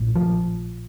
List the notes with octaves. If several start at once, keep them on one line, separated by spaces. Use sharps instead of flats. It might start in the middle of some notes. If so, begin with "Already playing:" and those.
Already playing: A#1 A2
F3